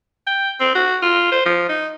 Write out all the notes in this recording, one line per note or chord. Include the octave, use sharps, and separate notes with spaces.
G5
C4
F#4
F4
C5
F3
D#4